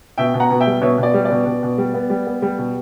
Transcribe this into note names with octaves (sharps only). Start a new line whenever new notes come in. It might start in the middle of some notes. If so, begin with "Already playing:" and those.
B2 E5 G5
B2
F#5 A#5
B2
E5 G5
G3
B2 C#5 E5
B2 D5
G3
D5
B2
B2
B2
G3
B3
G3
B3
G3
B2